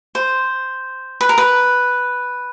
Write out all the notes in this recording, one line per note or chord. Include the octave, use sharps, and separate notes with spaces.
C5
B4
A#4
B4